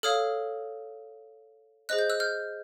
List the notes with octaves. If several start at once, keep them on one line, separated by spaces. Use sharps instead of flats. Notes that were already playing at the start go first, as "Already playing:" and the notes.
A4 C#5 F5 D#6 F6
G#4 C5 D#5 F#6
G6
E6 F#6
F6 G6